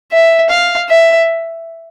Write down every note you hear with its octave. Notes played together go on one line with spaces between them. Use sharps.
E5
F5
E5